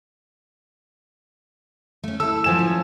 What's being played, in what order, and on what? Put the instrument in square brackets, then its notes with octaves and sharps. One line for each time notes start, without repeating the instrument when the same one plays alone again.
[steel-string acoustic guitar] A3 C#4
[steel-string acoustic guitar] E4 A4 [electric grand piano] E6
[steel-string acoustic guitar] G#2 F#3 B3 [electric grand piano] F3 G#5 E7
[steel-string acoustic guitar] C#4